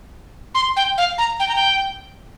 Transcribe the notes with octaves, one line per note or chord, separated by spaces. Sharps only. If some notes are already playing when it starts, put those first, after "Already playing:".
C6
G5
F5
A#5
G5
A#5
G5